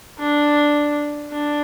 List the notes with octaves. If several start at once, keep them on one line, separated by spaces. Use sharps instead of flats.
D4
D4